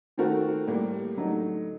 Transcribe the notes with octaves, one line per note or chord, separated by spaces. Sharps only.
D#3 A3 C4 F#4 A#4
A2 G3 A#3
D3 F#3 A3 D#4